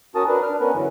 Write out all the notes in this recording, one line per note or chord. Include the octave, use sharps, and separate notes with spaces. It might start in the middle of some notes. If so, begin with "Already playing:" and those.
C#4 F#4 A#4 A5 D#6
D4 A#4 B4
D4 F6
B3 C#4 A#4 B4
F#2 D3 E3 F#3